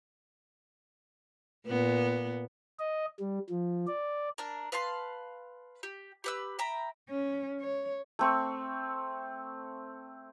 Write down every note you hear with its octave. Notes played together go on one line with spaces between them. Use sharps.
A#2 B3
D#5
G3
F3
D5
D4 A#4
B4 F5 A5 C6
G4
G4 B4 E6
E5 G5 A#5 B5
C#4
C#5
A3 C4 C#6